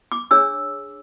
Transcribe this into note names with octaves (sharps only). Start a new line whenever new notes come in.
D6
D4 G#4 C#5 E6